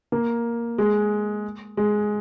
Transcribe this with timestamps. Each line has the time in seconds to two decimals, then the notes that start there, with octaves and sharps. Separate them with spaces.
0.12 A#3
0.78 G#3
1.77 G#3